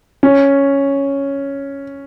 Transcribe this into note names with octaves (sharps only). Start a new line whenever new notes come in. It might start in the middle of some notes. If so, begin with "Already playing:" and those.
C#4